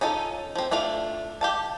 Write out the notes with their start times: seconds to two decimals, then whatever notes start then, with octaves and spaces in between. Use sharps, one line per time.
0.01 C#4 D#4 F4 A4
0.55 F3 C4
0.71 A3 D4 F4 F5
1.41 G4 F5 A5